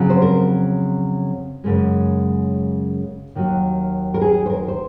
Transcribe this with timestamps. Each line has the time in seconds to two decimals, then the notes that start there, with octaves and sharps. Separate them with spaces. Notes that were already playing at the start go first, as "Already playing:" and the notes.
Already playing: F2 C#3 F#3 C4
0.10 C5
0.22 A#4
1.64 F#2 C#3 G#3
3.35 D#2 D#3 F#3
4.14 A#4
4.21 G#4
4.46 C5
4.50 A#4
4.68 C5